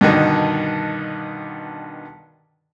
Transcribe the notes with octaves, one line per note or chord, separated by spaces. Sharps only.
G2 B2 D3 D#3